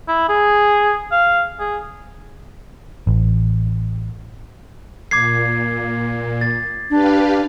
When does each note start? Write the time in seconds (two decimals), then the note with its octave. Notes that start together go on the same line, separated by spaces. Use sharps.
0.08 E4
0.29 G#4
1.12 F5
1.60 G#4
3.07 A1
5.11 A#2 D6 G#6 C7
6.41 A6
6.90 D4 G4 B4 F5